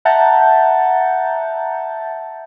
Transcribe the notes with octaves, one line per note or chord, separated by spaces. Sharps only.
E5 F#5 A5 A#5 G6 A6